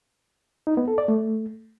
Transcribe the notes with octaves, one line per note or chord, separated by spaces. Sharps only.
D#4
B3
A4
D5
A3